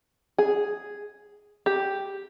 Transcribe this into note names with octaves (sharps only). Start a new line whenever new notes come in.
G#4
G4